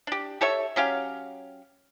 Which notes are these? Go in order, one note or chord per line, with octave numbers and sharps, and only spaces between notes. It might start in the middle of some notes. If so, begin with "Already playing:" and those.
D4 G4
G4 A4 C#5 E5
F#3 C#4 G4 F5